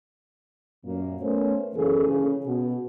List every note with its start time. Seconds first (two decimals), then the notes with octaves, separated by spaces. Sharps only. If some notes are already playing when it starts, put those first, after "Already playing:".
0.84 F#2 A#2 A#3
1.21 A3 B3 C#4 A#4 C5
1.75 F#2 C#3 E3 A#3 G#4 A4
2.07 C#3 G#4
2.45 B2